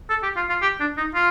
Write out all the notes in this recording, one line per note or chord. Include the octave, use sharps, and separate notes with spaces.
A4
G4
F4
F4
G4
D4
D#4
F4